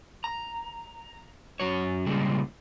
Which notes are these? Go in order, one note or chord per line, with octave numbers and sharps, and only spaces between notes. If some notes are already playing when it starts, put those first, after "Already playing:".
A#5
F#2 F#3 C#5
A#2 C#3 G3 G#3